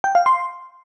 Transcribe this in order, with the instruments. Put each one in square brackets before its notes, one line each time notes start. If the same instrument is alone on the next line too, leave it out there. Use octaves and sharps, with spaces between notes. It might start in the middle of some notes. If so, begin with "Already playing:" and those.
[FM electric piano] G5
F5
C6